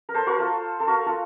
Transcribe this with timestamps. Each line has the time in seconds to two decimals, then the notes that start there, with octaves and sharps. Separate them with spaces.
0.09 A#4
0.14 A4 C5
0.27 F#4 A#4
0.39 F4 A4
0.80 A4
0.87 F#4 A#4
1.06 F4 A4